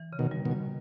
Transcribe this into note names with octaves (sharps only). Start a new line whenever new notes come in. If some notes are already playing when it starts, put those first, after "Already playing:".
Already playing: E3
C#3
B2 D#3
G3
B2 D#3
G3